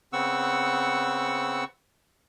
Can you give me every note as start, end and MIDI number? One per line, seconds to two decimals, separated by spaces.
0.13 1.64 49
0.13 1.64 59
0.13 1.64 60
0.13 1.64 78
0.13 1.64 85
0.13 1.64 88